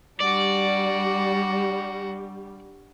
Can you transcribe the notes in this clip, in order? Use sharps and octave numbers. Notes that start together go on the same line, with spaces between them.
G3 D4 F#4 D5